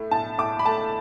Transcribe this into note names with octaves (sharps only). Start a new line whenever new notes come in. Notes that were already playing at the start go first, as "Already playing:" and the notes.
Already playing: A2 A3
A2 A5
A2 D6
B5
A3 A5